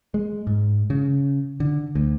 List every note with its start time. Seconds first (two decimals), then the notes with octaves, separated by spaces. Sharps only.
0.14 G#3
0.47 G#2
0.90 C#3
1.60 D3
1.95 D2